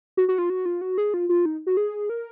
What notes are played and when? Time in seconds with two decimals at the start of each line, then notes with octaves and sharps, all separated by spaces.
0.17 F#4
0.29 F#4
0.38 F4
0.50 F#4
0.66 F4
0.81 F#4
0.98 G#4
1.14 F4
1.29 F4
1.46 D#4
1.67 F#4
1.77 G#4
2.10 A#4